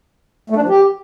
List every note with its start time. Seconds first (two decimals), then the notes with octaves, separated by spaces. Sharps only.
0.50 A3
0.56 D4
0.62 F3
0.68 G4